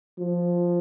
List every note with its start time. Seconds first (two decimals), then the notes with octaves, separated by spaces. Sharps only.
0.19 F3